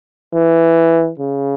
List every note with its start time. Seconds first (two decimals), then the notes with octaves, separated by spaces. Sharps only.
0.33 E3
1.19 C#3